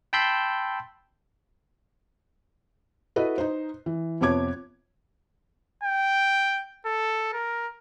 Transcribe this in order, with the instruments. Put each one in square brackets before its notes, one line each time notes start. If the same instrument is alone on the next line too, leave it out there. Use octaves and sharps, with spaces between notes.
[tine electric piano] G5 A5 B5 C6 E6 G6
[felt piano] E4 F#4 A4 B4 D#5
D#4 C5
E3
F2 C3 B3 C#5 D6 G#6
[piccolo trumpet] G5
A4
A#4